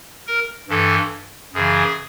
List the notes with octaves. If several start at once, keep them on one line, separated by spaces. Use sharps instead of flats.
A#4
G2 E3 A4
F#2 C#3 E3 G#4